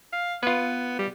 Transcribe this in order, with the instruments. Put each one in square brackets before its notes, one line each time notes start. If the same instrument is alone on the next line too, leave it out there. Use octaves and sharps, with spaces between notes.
[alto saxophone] F5
[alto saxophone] B3 [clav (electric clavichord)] F4 B4
[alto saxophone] G3